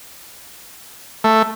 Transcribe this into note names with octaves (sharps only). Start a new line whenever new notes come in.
A3